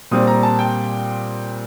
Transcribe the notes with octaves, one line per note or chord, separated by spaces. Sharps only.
A#2 G3 C4 D#6
A#5
A5
G5